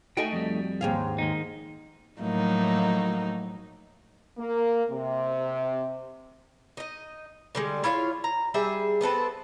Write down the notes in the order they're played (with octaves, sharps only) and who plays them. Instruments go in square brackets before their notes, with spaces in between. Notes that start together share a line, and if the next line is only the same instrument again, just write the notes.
[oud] A3 D#4 F#4 [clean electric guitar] G5 G#5
[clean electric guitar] F2 G3
[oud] D#2 G#2 F5
[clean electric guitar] D#3 A#3 D#4
[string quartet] A2 F3 F#3 A3 A#3 D#4
[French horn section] A#3
C3
[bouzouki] D#4 D#5
D3 G3 G#3
E4 F4 C#5 F5
A#5
G3 G#4 E5
B3 C4 A4 B4